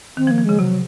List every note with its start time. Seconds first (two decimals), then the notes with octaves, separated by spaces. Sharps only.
0.17 D#3 C4
0.27 F3
0.31 A#3
0.38 F3
0.45 C#3 G#3
0.59 C3 F#3